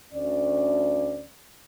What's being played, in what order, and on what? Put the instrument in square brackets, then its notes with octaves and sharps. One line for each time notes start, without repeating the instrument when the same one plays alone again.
[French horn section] D2 C#4 D5